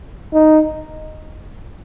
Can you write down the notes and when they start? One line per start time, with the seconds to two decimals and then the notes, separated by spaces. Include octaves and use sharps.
0.33 D#4